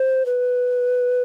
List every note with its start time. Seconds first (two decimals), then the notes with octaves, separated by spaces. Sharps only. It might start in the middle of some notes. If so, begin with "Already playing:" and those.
Already playing: C5
0.26 B4